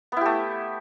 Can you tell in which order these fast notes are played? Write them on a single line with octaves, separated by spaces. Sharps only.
B3 E4 G4 A3